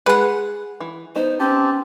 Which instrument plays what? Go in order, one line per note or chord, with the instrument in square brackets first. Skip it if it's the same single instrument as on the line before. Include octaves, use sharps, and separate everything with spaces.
[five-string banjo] G#3 G#4 [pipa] B4 F#5
[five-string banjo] E3
[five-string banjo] B3 D#4 [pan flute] C5
[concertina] C4 G4 A5 [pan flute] C#4